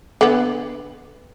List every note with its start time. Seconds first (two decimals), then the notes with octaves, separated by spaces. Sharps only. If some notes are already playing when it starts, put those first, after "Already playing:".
0.21 D3 B3